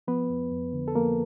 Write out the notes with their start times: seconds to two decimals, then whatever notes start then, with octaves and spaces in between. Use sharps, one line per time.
0.08 F3 B3 B4
0.30 F2
0.52 F2
0.73 D3
0.88 A4
0.95 F3 A#3 A#4